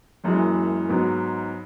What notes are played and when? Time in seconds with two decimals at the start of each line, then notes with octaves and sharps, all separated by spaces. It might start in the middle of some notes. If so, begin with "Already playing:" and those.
0.24 F#1 F#2 E3 G#3
0.88 G#2 F#3 B3